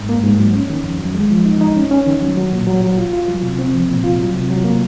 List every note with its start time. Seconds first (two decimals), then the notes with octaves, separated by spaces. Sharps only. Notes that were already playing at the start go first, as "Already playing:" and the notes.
Already playing: G#2
0.09 A#3
0.24 G#2
0.39 F#3
0.54 C#4
0.70 D#3
0.84 F2
0.99 F#3
1.15 G#3
1.31 F3
1.45 D#4
1.61 D#4
1.76 C#4
1.91 C#4
2.07 D#3
2.22 F#3
2.37 F#3
2.52 A#2
2.67 F#3
2.82 F#3
2.97 F4
3.13 F4
3.28 F#3
3.43 C3
3.59 C4
3.73 F3
3.88 A#2
4.04 F4
4.19 F#3
4.34 C3
4.50 F#3
4.64 A#3